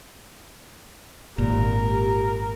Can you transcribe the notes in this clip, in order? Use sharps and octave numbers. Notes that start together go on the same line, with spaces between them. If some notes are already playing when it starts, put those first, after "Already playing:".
G#1 A#2 G4 A#4